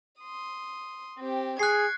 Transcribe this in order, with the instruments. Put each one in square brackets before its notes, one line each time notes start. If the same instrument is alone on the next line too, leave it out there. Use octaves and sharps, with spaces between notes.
[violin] C6 D#6
C4 G4
[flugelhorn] G#4 [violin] C#6 G#6 [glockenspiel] F#6 C7